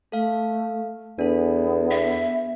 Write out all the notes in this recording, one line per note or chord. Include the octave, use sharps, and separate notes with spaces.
A3 A4 F5
E2 B3 D4 A4
E5